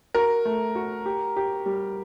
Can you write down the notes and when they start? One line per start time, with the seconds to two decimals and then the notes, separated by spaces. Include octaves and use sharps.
0.14 F#4 A#4
0.45 A3
0.75 F#4
1.06 G4
1.36 G4
1.66 G3